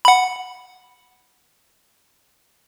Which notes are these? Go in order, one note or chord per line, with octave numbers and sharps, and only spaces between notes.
F#5 B5